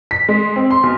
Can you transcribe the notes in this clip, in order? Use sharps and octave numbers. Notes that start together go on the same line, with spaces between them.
B6
G#3
C4
C6
B1